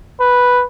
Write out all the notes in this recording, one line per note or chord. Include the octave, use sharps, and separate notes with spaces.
B4